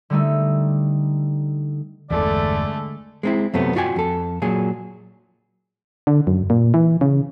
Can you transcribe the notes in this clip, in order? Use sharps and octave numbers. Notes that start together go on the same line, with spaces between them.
D3 G3 A3 D#4
G1 E2 D3 E3 G#3 A3 D5
G#3 C4 E4
F#2 C3 A3 B3
F4 F#4 D5 G5 G#5
F2 A4
A#2 F#3 G#4
D3
F#2
A#2
E3
C#3